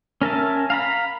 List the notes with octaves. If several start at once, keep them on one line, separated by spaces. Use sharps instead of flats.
C#4 A#4 E5 A5
F5 A#5 B5